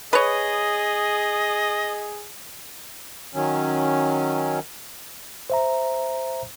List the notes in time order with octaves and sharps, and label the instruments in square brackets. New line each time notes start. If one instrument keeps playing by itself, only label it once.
[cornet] G#4 [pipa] B4 C#5 [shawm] D#5
[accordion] D#3 F#3 C#4
[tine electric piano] C5 E5 A#5